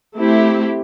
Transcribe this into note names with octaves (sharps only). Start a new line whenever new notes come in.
A3 C4 E4 G4